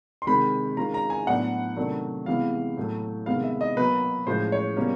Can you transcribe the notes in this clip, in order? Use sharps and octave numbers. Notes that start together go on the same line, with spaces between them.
C6
C3 D#3 G#3 C4 B5
D#3 G#3 C#4 F4 A#5
A#5
G#5
A2 F#3 B3 D4 F#5
C3 D#3 F#3 A3 D4
C3 E3 G#3 B3 F5
A2 F#3 A3
C3 D#3 G#3 B3 F5
E5
D#5
B2 F#3 A#3 B4
A2 F3 G#3 C#4 C5
C#5
B2 G3 A#3 C#4